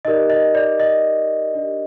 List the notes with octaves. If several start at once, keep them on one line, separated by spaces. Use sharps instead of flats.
D#4 G4 A#4 D5 D#5
D#5
D5
D#5
D4 G4 A#4 D5